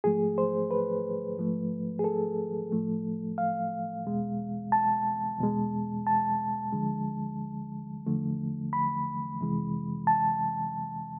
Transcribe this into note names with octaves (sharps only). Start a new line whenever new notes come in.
G#2 F3 A3 G#4
C5
B4
G#2 F3 A3
G#4
A4
A2 F3 A3
F5
E2 B2 G#3
A5
E2 B2 G#3
A5
D2 D3 F3 G#3
E2 D3 F3 A3
B5
F2 C3 E3 G#3
A5